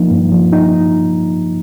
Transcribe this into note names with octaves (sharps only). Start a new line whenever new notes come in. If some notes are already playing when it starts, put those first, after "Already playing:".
Already playing: F3 A#3 D#4
G2
F3
D#4